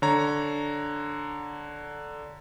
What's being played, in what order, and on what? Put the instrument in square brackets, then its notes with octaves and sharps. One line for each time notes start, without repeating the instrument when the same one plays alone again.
[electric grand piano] D3 C#5 A#5